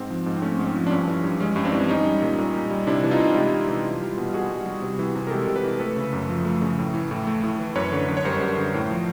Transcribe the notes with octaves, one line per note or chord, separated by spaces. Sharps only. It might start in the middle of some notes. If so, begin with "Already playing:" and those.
Already playing: G#2 C4
F3
G#2
C4
A3 C#4
G#2
C4
F3
D4
G2 C#4
E3
G2
G#3 C#4
G2
C4 D4
E3
G3 C#4 D#4
G3
A#2
A#2
G3
G3
C3 D4 E4
E3
D#4 F4
C3
G#3 F4 G4
C3
E3
G3
G3
B2
B2 F#4 G#4
G3
G3
C3
E3
C3
A#4
G#3 G4 A4
C3
A4 B4
E3
A3 A4 B4
C#3
F#2
F3
A3
C#3
A2
E3
A2
A3
A2
E3
F#2 B4 C#5
D3
F#2
C#5
G3 A#4 C5
F#2
D3
A2
F3